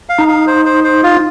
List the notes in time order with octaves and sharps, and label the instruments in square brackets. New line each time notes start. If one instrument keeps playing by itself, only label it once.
[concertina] F5
[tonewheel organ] D#4
[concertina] F5
C5
C5
C5
F4